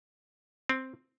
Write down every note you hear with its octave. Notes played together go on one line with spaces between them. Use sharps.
C4